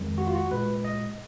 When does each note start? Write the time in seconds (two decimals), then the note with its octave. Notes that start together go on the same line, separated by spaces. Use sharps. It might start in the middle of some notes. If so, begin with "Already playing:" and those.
Already playing: F2 D#3 G#3
0.18 F#4
0.27 F4
0.35 F#4
0.51 A#2 G#3 B4
0.84 D#5